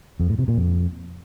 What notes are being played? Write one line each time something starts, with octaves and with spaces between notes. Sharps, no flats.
F2
A2
C3
A#2
F2